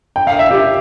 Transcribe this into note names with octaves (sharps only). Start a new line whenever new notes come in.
G5
F5
E5
G4